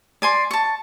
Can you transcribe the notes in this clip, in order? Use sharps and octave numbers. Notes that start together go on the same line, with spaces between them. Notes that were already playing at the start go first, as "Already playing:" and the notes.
D5 G#5 C6
A5 C#6